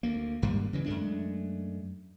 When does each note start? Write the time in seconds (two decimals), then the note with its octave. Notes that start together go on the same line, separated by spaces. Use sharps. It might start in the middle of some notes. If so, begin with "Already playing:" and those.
0.03 D2 A#3
0.42 G#1 G2 G3 A#3
0.73 C#3 E3 G3
0.86 F#2 G#3 A3 D4